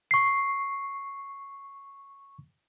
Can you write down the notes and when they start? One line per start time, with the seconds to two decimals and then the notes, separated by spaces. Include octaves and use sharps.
0.11 C#6 C7